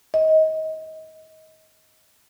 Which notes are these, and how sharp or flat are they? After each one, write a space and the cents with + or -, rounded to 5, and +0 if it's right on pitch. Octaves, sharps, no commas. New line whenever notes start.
D#5 +25